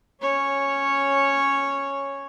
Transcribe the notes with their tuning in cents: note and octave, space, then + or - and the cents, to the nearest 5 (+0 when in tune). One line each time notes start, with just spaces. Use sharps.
C#4 +0 C#5 -5